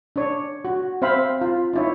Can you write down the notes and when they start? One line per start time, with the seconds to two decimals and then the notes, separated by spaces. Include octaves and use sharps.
0.16 D4 C#5
0.65 F#4
1.02 C4 C5 E5 F5 B5
1.41 F4
1.73 D#4 E4 C#5